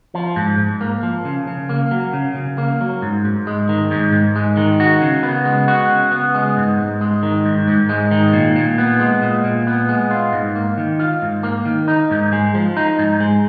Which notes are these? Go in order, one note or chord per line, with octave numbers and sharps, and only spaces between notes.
F3
G#2
G#2
A#3
F3
C#3
C#3
A#3
F#3
C#3
C#3
A#3
F#3
G#2
G#2
G#3
D#3
G#2
G#2
G#3
D#3
F#4
C#3
B3
G#3
F#4
C#3
B3
G#3
G#2
G#2
G#3
D#3
G#2
G#2
G#3
D#3
A#2
A#2
B3
G#3
A#2
A#2
B3
G#3
F4
G#2
A#3
D#3
F4
G#2
A#3
D#3
D#4
G#2
G#3
F3
D#4
G#2
G#3